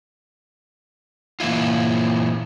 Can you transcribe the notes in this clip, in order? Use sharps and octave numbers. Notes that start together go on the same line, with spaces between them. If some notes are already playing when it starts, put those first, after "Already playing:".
A#2 E3 A#3 E4 F4